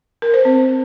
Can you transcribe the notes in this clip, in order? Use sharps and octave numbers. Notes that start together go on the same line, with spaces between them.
A#4
C5
C4